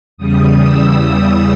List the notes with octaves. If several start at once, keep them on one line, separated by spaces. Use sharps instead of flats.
E2 C#3 G3 D#6
E6